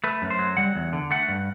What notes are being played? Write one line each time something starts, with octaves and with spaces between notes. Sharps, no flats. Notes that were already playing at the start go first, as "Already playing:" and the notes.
A3 B4
F#2
C5
F#3
G3 F#5
E2
D3
A3 F#5
G2